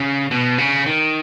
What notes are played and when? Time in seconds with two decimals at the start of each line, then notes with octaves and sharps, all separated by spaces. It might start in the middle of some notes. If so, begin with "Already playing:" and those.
Already playing: C#3
0.31 B2
0.58 C#3
0.86 D#3